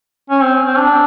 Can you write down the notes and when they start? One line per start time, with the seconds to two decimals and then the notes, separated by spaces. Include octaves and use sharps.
0.30 C#4
0.42 C4
0.67 C4
0.78 D4